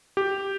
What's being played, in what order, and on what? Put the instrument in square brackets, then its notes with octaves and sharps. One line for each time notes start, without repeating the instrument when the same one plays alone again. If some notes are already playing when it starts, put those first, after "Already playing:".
[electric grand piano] G4